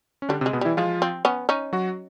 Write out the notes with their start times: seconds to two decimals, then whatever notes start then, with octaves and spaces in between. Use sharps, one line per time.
0.22 C#4
0.29 D3 G3 D4
0.41 C3 C4
0.46 G#3
0.53 B2 B3
0.61 E3 G3 E4
0.77 F3 G#3 F4
1.02 C4
1.25 B3 C#4
1.49 C#4 D#4
1.73 F#3 F#4